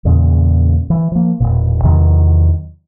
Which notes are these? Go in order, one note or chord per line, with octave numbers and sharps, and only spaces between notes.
E2 A#2 C#3
E3
F3 A#3
E1 E2 A#2
E2 C3 D#3 F#3